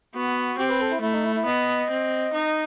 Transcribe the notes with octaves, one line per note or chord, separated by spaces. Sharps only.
B3 F#4
C4 G4
B4
A4
E4
A3 E4
D#4
E4
E4
B3 D#5
C4
D#4